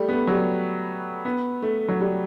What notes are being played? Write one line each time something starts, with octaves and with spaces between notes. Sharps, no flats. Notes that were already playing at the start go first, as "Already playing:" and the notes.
Already playing: G3 A3
B3
A3
F#3
G3
B3
A3
F#3
G3